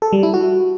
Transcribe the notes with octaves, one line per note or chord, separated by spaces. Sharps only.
A4
G3
E4
F#4